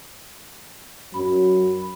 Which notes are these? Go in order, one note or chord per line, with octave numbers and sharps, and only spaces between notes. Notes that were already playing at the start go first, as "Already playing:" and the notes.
F#2 F#3 B5